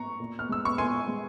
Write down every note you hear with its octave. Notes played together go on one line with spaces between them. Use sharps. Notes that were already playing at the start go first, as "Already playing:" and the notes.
Already playing: A#5 C#6
A#2
F6
G#3 E6
C#6
A#2 G#5 C6
G#3